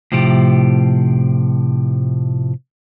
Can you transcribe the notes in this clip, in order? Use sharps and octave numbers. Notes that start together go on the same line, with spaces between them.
A2 C3 F3 E4 G4